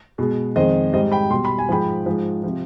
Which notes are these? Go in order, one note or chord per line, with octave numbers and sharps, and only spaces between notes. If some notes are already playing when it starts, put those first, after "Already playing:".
B2 G#3
F2 D#3 G#3 C5 D#5
G#2 G3 C5 D#5
G5 B5
B2 G3 C6
B5
G#5
G#2 F3 G#3 G5 B5
G#2 F3 G#3
C3 F3